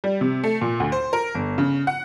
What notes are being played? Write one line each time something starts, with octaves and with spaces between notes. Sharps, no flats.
G3
C3
A3
A#2
D2
C5
A#4
G1
C#3
F#5